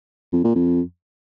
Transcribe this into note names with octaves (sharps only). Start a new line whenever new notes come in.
F2
A#2
F2